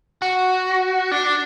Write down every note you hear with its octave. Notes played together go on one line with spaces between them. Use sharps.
F#4
D4